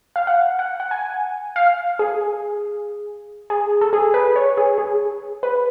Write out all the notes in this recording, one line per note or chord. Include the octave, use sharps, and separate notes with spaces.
F5
F#5
F#5
F#5
G#5
F5
G#4
G#4
A4
G#4
B4
C#5
G#4
G#4
B4